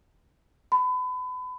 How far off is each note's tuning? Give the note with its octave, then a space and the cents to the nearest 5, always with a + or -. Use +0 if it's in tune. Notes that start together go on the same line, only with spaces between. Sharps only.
B5 +30